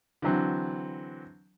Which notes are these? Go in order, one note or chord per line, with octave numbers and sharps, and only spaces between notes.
D3 E3 F#3 C4